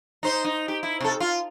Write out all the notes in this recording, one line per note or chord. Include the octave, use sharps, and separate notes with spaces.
D#4 C5
D#4
G4
E4
C3 A4
F4